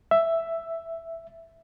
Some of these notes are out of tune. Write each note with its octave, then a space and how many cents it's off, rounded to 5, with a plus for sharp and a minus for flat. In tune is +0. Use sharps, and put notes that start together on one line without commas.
E5 +5